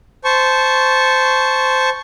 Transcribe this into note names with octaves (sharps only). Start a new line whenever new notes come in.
C5 A5 C#6